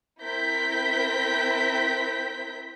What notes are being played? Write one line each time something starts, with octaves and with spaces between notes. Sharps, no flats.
C4 E4 A#4 G6 B6